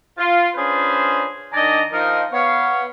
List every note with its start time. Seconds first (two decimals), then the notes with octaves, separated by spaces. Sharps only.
0.17 F4
0.55 C#4 D4 F4 G#4 B4 C5
1.53 D#3 D4 D5 D#5 G#5 A#5
1.92 F3 D#4 A#4
2.33 B3 C#5 F5